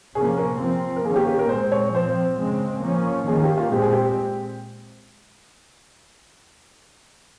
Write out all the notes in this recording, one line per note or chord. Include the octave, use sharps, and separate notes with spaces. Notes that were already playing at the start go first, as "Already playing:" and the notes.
C3 F3 A#3 C#4 G#4
A#4
F3 C4
A#4
D#3 A#3 C#4 G#4
G4
G4
A#4
A#2 G#3 C4 C5
C#5
F3 C4 C5
C#3 G#3 C4
F3 A#3 C#4
D#3 A#3 C#4 G#4
G4
F4
A#2 G#3 C4 G4
G#4
G4